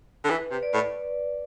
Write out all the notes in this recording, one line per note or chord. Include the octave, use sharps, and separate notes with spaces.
D3
E3 B4
C3
D5
A2